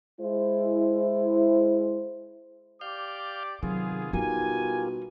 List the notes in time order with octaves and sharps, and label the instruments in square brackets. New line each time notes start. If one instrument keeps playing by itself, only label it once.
[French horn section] G#3 E4 C5
[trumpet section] G4 D5 D6 [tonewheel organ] F5 F6 G6
[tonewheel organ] C3 D#3 [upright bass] F#3 [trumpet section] B3 F4 G#4
[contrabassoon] B2 [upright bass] G3 D#4 [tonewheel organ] F4 G4 A#4 [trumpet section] G#5